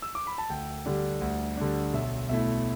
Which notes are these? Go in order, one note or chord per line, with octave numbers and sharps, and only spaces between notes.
E6
D6
B5
A5
D2 G5
D3 G3 D4
D2
D3 G3 D4
B1 E5
B2 A3 E4 E5